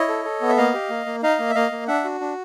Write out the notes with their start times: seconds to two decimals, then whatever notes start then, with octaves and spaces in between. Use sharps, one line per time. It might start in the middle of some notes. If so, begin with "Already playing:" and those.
Already playing: E4 C#5 D#5
0.09 A4
0.25 A4
0.41 B3
0.49 E5
0.57 A#3 D#5 F5
0.74 G4
0.90 A#3
1.06 A#3
1.23 D#4 D#5 F5
1.39 A#3
1.50 E5
1.55 A#3 D#5 F5
1.72 A#3
1.87 D4 E5 F#5
2.05 F#4
2.21 D4